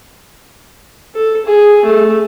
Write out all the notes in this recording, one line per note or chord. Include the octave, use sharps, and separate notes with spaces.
A4
G#4
A3